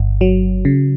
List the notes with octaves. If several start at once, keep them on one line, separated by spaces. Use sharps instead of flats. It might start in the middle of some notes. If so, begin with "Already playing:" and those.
Already playing: G1
F#3
C#3